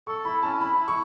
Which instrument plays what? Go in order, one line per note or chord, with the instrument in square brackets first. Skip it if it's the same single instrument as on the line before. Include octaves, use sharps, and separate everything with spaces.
[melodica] A4 [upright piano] C#6
[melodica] E4 [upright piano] B5
[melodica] C#4 [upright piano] A5
[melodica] E4 [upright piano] B5
[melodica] E4
[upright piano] C#6